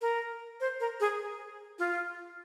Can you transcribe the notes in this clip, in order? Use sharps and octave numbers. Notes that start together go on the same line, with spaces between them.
A#4
C5
A#4
G#4
F4